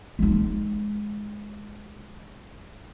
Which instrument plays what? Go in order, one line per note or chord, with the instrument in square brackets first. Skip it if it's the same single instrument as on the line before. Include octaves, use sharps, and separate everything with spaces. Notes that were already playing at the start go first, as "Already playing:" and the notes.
[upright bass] G#3 D#4